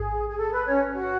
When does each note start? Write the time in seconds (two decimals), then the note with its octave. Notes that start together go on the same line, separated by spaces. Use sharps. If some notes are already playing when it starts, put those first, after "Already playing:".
Already playing: A1 G#2 G#4
0.29 G#4
0.38 A4
0.51 B4
0.66 C#4 C#5
0.95 F#4 F#5